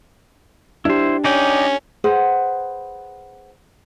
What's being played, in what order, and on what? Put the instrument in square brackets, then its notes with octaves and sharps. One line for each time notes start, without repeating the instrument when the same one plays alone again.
[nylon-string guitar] D4 G4 [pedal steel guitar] E4 C5
[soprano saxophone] C#4 [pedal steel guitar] D#4 D5 G5
[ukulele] G#4 B4 C5 F#5